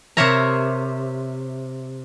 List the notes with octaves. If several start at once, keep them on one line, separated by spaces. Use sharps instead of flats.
C3 A#4 C5 C#5 E5 A#5